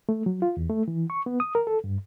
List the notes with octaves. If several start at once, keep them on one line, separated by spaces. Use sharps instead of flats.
A3
F#3
F4
E2
A3
E3
C#6
B3
D#6
A#4
A4
G2